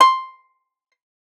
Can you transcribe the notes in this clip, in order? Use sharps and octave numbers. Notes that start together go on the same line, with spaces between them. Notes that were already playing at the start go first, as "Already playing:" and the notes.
C6